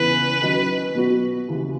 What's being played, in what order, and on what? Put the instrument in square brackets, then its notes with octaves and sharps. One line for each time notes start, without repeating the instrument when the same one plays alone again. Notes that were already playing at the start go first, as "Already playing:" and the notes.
Already playing: [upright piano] E2 C#3 E3 B3 [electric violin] B4
[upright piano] D#3 F#3 C#4
B2 F#3 B3 F#4
D#2 C#3 E3